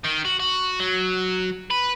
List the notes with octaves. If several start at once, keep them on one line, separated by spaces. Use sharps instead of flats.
D#3
F#4
F#4
F#3
B4